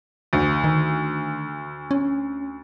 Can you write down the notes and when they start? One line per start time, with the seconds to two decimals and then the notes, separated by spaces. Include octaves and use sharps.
0.33 D2
0.64 D#3
1.91 C#4